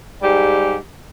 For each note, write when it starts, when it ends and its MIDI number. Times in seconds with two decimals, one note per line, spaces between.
0.22 0.75 44
0.22 0.75 55
0.22 0.75 67